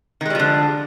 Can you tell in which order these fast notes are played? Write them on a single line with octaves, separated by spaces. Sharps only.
D#3 G#3 G3 F3 D3